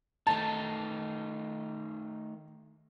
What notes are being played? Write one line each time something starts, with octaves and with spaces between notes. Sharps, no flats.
D#3 A3 D#4 A5